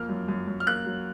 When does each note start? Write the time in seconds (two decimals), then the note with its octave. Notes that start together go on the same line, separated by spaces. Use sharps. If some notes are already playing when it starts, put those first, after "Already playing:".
Already playing: F2 A#3 F6
0.09 F#2
0.28 F#2
0.48 F#2
0.60 F6
0.67 A#3 F#6
0.86 F#3